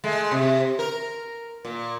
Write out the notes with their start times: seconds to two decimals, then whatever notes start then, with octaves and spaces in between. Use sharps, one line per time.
0.04 G#3 A3
0.31 C3
0.79 A#4
1.65 A#2